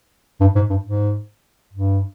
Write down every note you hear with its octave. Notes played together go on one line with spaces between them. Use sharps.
G2
G#2
G2
G#2
G2